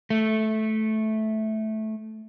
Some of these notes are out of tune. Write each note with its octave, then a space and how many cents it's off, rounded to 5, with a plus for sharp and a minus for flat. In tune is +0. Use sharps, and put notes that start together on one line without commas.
A3 -10